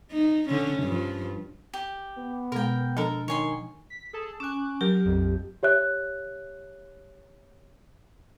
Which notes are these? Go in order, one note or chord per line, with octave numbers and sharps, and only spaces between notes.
D#4
D3 C#4
G2 F3
G4
B3
B2 G#3 A#4 G5
F3 D4 A4 A#4
D#3 C#5 G#5 C6
B6
G#4 A4 A5
C#4 G#5 D6 F#6
F#3 G4 A#4
A#1 F2
G4 C#5 E5 F#6